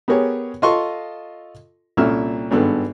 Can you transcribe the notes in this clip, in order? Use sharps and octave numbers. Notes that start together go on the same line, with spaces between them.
B3 G4 G#4 A#4 C#5
F4 A4 D#5 A5 C6 C#6
C2 A#2 C#4 A4 E5 F6
G#1 G2 B3 A4